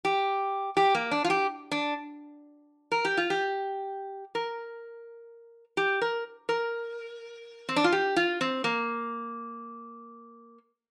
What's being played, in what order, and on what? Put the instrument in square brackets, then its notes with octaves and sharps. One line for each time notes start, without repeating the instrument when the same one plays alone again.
[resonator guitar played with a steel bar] G4
G4
A#3
D4
F4
G4
D4
A#4
G4
F4
G4
A#4
G4
A#4
A#4
C4
D4
F4
G4
F4
C4
A#3